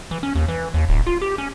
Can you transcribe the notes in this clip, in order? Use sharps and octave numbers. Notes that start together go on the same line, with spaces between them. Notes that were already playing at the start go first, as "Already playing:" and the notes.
E3
C#4
D#2
E3
D#2
D1
F4
G4
C#4